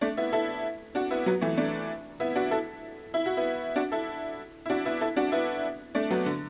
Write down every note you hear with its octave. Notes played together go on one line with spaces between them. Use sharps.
A3 D4
B3 E4
E4 A4
D4 F#4
B3 E4
F#3 B3
E3 A3
A3 D4
B3 E4
D4 F#4
E4 A4
E4
F#4
B3 E4
D4 F#4
E4 A4
E4
D4 F#4
B3 E4
E4 A4
D4 F#4
B3 E4
A3 D4
F#3 B3
D3